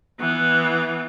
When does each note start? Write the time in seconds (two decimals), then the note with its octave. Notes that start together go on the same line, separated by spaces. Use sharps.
0.20 E3 B3